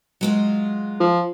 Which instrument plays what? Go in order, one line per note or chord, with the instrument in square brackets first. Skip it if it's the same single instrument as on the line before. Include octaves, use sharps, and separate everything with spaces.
[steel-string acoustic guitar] F#3 G#3 F4
[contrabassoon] F3